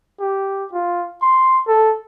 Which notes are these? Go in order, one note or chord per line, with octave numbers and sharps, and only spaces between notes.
G4
F4
C6
A4